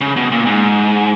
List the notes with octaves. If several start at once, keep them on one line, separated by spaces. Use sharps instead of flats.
C#3
B2
A#2
G#2